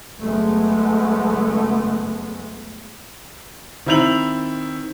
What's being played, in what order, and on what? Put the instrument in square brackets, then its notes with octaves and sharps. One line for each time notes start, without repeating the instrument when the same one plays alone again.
[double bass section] F#1 G#3 A3 B3
[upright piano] D#3 C4 E4 G6 F7 F#7